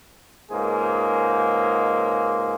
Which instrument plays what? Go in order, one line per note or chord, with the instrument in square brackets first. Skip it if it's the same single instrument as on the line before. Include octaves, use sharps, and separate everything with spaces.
[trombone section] C#2 G#2 A#3 G#4 C5